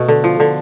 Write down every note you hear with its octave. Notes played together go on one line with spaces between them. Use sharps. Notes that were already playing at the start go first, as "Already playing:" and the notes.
Already playing: B2 A3
D3
F3
D3